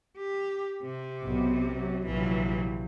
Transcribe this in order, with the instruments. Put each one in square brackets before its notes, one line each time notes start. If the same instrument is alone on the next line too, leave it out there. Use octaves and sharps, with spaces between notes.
[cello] G4
C3
[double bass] B1 B3
F#3
[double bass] A#1 C3 [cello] E3 F#3